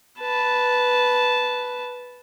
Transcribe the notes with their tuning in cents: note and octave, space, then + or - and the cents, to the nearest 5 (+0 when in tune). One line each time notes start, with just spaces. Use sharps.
B4 +0 A5 -10